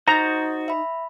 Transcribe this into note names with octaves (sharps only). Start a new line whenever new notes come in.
D#4 F#4 C5 A#5 D#6 G6 A6
E5 B5